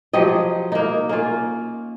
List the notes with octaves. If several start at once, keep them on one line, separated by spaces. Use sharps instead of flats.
F3 F#3 G4 D#5
A#3 D#4
A#3 C#4 F4